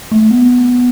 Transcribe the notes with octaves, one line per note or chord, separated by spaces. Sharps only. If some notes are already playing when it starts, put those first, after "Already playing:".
A3
B3